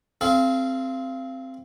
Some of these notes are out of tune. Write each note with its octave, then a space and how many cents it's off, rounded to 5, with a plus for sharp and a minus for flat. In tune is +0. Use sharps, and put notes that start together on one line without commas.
C4 +0 A4 -45 F5 -25